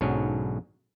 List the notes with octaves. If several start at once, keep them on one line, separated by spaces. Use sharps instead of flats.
B1 G#2 D3 F#3 C#4